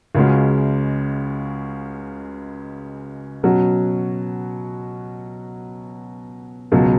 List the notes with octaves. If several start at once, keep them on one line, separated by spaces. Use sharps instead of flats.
C#2 C#3 G#3 C#4 F#4
B2 F#3 C#4 F#4
C#2 B2 F#3